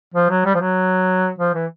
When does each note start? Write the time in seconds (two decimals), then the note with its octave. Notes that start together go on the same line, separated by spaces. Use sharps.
0.15 F3
0.30 F#3
0.46 G3
0.54 F3
0.61 F#3
1.39 F3
1.55 E3